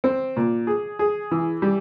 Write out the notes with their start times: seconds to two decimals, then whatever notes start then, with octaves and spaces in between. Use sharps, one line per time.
0.04 C4
0.36 A#2
0.67 G#4
0.99 G#4
1.31 E3
1.62 G3